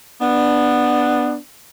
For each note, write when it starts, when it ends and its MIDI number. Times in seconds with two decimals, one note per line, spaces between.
0.21 1.38 59
0.21 1.38 62